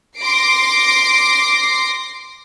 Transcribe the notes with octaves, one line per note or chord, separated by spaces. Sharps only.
C6 D6 A#6 C7 D7